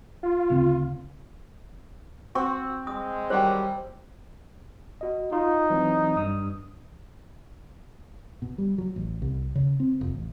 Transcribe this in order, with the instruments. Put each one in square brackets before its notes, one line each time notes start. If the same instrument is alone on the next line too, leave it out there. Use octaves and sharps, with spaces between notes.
[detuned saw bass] F4
[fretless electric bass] D2 C#3 C4
[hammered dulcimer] C4 [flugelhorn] F#4 [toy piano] C#6
[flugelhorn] G#3 [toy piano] D#6
[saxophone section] D#3 F#3 G3 [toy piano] C5 G5
[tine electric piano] F#4 D#5
[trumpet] D#4 [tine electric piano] F4
[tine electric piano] E3 F#3 C4
G2 D#6
[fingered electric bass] B2
G3
F#3
A1
C2
C#3
C4
F1
A1